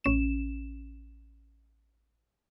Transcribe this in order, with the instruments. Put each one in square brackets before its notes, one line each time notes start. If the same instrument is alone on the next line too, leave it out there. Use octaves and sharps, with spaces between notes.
[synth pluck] A1 C#4 E7